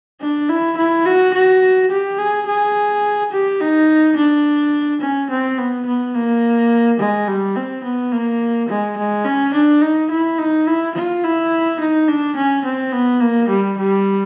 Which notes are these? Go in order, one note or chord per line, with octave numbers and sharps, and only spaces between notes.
D4
E4
E4
F#4
F#4
G4
G#4
G#4
G4
D#4
D4
C#4
C4
B3
B3
A#3
G#3
G3
C4
B3
A#3
G#3
G#3
C#4
D4
D#4
E4
D#4
E4
F4
E4
D#4
D4
C#4
C4
B3
A#3
G3
G3